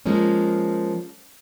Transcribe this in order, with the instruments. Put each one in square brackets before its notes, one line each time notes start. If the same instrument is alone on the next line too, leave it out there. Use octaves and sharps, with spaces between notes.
[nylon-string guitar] F3 G#3 A#3 C#4